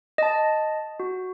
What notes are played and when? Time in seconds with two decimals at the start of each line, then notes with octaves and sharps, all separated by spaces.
0.18 D#5 A5
1.00 F#4